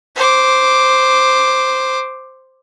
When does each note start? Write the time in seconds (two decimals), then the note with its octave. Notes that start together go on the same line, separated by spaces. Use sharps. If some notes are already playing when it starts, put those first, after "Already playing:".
0.16 C5 D6